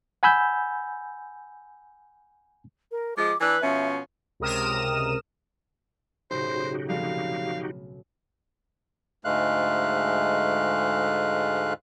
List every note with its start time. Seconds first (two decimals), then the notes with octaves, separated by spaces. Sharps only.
0.23 F#5 G#5 B5 E6 G6
2.91 A#4
3.17 F3 G#3 D6
3.40 E3 D4 B4 E6
3.61 B2 F3 C#4 E5
4.40 C#2 C3 A#4 D#6 F6 E7
6.31 B1 A2 C#3 D#4 F#4 G4 C5
6.90 F1 F5
9.25 D2 G#2 G#3 A3 F5 F#6